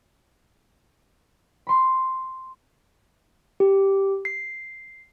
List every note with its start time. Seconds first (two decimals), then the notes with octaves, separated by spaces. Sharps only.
1.67 B5 C6
3.60 G4
4.25 C7